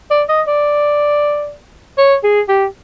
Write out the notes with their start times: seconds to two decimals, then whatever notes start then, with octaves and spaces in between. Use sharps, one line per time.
0.11 D5
0.29 D#5
0.48 D5
1.98 C#5
2.24 G#4
2.48 G4